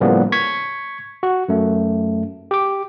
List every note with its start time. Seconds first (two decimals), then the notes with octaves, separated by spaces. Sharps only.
0.01 A2 C#3 F3 G3 A#3 B3
0.32 C#6 G#6 B6 C#7
1.23 F#4
1.48 F#2 A3
2.51 G4 D6